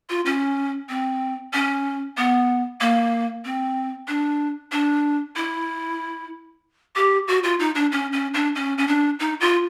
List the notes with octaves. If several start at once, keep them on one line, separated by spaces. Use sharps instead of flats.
F4
C#4
C4
C#4
B3
A#3
C4
D4
D4
E4
G4
F#4
F4
D#4
D4
C#4
C#4
D4
C#4
C#4
D4
D#4
F4